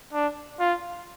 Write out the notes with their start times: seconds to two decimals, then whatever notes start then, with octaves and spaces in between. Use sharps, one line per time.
0.13 D4
0.60 F4